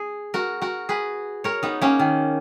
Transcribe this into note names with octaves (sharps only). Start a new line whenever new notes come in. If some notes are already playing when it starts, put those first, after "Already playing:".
Already playing: G#4
F#4 A#4
F#4 A#4
G#4 B4
A#4 C#5
B3 D#4
A#3 C#4
D#3